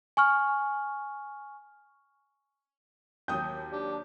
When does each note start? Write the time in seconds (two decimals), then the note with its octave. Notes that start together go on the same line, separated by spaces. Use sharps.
0.17 G#5 C#6 F6
3.28 D#2 F#3 G5 D#6 G6
3.72 D4 G4